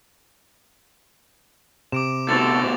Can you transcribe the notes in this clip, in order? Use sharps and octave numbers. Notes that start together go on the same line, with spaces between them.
C3 D6 D7 E7
D2 B2 A4 A6 F7